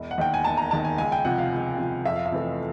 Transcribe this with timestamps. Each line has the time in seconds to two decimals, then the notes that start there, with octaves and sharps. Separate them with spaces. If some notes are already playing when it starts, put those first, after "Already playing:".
Already playing: E1
0.11 F#5
0.18 D#2 D#3 G5
0.34 G#5
0.44 E1 A5
0.57 A#5
0.71 D#2 D#3 A5
0.85 G#5
0.98 C#2 G#5
1.12 G5
1.25 C3 F3 F#5
1.38 F5
1.52 C#2
1.78 C3 F3
2.05 F2 E5
2.16 F5
2.26 E5
2.32 C3 E3 A3